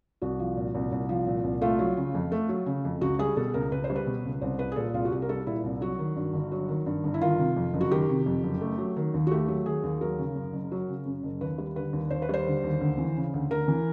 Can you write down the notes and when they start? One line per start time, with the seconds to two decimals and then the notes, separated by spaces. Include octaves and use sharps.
0.22 C2 F#4
0.39 F3
0.57 A#2
0.75 C2
0.92 C2
1.09 F3
1.27 A#2
1.44 C2
1.61 A3 F4
1.79 F#3
1.97 C#3
2.15 F2
2.32 A3
2.49 F#3
2.66 C#3
2.85 F2
3.01 C#2 F#4
3.19 G3 G#4
3.36 B2 A4
3.54 C#2 A#4
3.72 C#2 B4
3.84 C5
3.90 G3
3.96 B4
4.06 B2
4.25 C#2
4.41 C2 C5
4.59 G3 B4
4.72 G#4
4.76 A#2 A4
4.94 C2 F4
5.05 F#4
5.11 C2 G4
5.22 A#4
5.29 G3 A4
5.47 A#2 E4
5.64 C2
5.81 F#3 F#4
5.99 D#3
6.16 G2
6.33 G1
6.52 F#3
6.68 D#3
6.86 G2
7.04 G1
7.14 E4
7.21 D#3 F4
7.39 C3
7.57 F2
7.74 F#1
7.81 F#4
7.91 D#3 G4
8.09 C3
8.26 F2
8.44 F#1
8.61 A3
8.78 F#3
8.96 D#3
9.14 D#2
9.27 F#4
9.31 A3 G4
9.48 F#3
9.66 D#3 G#4
9.84 D#2
10.01 F#3 A#4
10.19 C#3
10.36 F#2
10.53 F#1
10.72 F#3
10.89 C#3
11.06 F#2
11.23 F#1
11.41 D#2 B4
11.58 G3
11.76 D3 B4
11.93 D#2
12.10 D#2 C5
12.22 B4
12.29 G3 C5
12.47 D3
12.64 D#2
12.81 D2
12.98 E3
13.16 C#3
13.34 D2
13.51 D2 A#4
13.68 E3